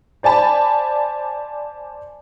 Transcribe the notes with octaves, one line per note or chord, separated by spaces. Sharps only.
C5 D5 G#5 A5 B5